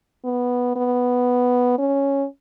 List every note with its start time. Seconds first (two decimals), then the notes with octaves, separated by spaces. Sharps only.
0.25 B3
0.76 B3
1.78 C#4